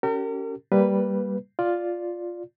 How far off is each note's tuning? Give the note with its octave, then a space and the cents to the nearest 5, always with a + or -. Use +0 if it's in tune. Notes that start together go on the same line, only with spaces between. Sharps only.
C#4 +15 G4 -35 A#4 -40
G3 +0 A#3 +0 B4 +0
F4 +0 D5 +0